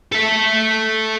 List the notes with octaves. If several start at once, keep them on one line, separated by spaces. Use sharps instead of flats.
A4 E5